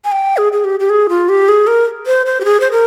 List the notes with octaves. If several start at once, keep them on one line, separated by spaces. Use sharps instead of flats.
G#5
G5
G#4
G#4
G4
G4
G#4
F4
G4
G#4
A#4
C5
C5
G4
G#4
C5
A#4